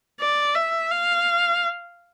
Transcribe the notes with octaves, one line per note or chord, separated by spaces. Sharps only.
D5
E5
F5